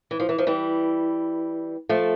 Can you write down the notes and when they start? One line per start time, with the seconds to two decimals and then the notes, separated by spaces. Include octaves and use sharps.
0.11 E3
0.20 F3
0.29 E3
0.38 F3
0.47 E3 G3
1.89 F3 A3